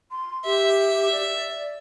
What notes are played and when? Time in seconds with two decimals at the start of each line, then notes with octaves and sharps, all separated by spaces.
0.11 C6
0.45 G4 E5
1.11 D5